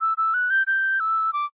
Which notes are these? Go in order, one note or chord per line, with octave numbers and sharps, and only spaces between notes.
E6
E6
F#6
G6
G6
E6
D6